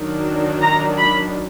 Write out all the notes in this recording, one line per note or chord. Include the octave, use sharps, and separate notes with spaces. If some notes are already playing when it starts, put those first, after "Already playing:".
Already playing: D#3 F#3 D4
A#5
B5